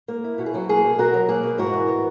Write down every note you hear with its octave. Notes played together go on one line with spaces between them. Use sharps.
A#3
E4
B2 F#4
G#4
F#3 F#4
A#3 G#4
B2
B2 F#4 A#4
F#3
A#3 G#4
B2
G#2 F#4 A#4
E3
B3